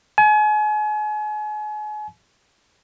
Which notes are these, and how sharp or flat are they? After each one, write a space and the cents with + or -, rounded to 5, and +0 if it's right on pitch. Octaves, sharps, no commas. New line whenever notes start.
G#5 +35